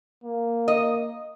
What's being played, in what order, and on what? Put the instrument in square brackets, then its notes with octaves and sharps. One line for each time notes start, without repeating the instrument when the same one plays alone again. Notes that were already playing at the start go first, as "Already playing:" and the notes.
[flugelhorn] A#3
[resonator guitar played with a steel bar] D#5